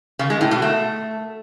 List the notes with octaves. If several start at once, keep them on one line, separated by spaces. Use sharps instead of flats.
C#3
G#3
A2
B2
A3